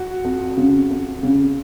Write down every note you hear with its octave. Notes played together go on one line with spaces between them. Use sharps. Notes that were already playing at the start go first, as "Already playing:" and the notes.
Already playing: F#4
F2
C#3
F2
C#3